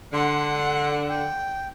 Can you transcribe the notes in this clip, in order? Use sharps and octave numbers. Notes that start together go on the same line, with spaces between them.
D3 F#5 C6
G5